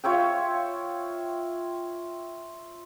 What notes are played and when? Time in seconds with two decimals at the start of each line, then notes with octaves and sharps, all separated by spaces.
0.04 F4 C#5 E5 G5